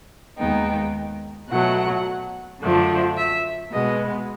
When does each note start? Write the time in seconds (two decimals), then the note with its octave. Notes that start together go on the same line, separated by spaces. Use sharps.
0.38 D#2 D#3 G#3 B3 D#4 G5
1.49 B2 F#3 A3 F#5
2.61 F#2 D3 F3 A3 D4
3.16 E5
3.72 B2 G#3 B3 D#5